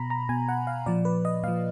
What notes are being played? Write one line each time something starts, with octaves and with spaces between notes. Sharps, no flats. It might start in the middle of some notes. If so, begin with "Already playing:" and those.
Already playing: B2 A#5 B5
A#5
B2 G#5
F#5
F5
A#2 F3 D5
B4
D#5
A#2 F3 F5